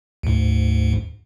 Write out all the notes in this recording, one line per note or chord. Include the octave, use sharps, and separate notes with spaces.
D2 G#2